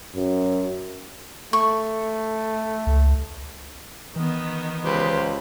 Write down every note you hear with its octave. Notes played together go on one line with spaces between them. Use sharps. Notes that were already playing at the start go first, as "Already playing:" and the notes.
F#2
A3 C#6
C#2
D#3 E3 B3
C#2 G4 B4 C5